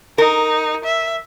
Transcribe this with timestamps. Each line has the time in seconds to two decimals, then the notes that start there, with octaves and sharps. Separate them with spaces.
0.18 D#4 A#4
0.84 E5